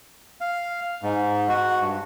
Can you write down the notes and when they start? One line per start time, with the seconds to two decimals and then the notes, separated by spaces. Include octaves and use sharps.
0.41 F5
1.03 G#2
1.49 F#4
1.81 G2